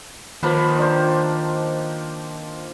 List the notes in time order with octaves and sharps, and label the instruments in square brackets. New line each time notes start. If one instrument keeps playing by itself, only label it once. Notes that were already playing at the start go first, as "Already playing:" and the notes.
[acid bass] D#3 [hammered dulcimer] F3 A#3 B4
[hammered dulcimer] D4 C5